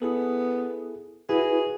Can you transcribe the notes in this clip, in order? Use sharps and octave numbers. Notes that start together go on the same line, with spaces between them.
B3 E4 G#4 A4
E4 F#4 G#4 B4 G#5